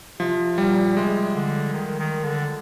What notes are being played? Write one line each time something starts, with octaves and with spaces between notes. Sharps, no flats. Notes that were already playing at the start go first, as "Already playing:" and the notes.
C3 F3
A#2 G3
C3 G#3
D3
D#3
D#3
D3